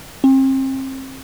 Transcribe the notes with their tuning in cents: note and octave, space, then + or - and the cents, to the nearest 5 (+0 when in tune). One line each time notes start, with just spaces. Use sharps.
C4 +35